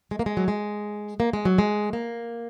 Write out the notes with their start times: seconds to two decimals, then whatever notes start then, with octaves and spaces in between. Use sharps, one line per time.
0.11 G#3
0.19 A#3
0.26 G#3
0.37 F#3
0.48 G#3
1.20 A#3
1.33 G#3
1.45 F#3
1.58 G#3
1.93 A#3